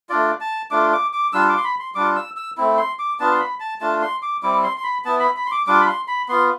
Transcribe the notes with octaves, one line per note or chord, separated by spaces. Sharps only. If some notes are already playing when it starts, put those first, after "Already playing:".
A3 D4 F4 D5
A5
A3 D4 F4 D6
D6
D6
G3 D4 F4 E6
D6
C6
B5
C6
G3 D4 F4 D6
E6
E6
A3 C4 E4
C6
D6
B3 D4 F4 A5
C6
B5
A5
A3 D4 F4 A5
C6
D6
G3 C4 E4 D6
C6
C6
B5
B3 E4 A5
B5
B5
C6
D6
G3 D4 F4 D6
B5
C6
B5
B3 F4 C6